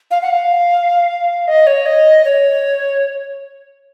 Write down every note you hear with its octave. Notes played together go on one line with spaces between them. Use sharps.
F5
F#5
F5
D#5
C#5
D#5
C#5